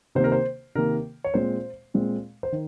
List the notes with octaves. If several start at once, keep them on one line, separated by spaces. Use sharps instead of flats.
C3 D#3 A#3 C5
A#4
C5
C3 D#3 A#3 A#4
C#5
A#2 G#3 C4 C5
A#2 G#3 C4
C5
D#3